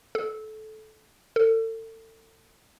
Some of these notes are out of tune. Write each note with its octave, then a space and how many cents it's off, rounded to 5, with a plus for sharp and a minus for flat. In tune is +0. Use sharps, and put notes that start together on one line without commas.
A4 -20
A4 +35